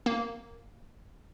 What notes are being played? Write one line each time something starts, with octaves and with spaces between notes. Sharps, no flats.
A#3